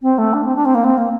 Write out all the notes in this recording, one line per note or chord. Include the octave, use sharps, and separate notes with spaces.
C4
A3
D4
C4
D4
C4
A#3
C4
A#3